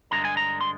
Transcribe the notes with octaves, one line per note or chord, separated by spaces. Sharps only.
G2 D3 G#3 A#5
G#5
A#5
C6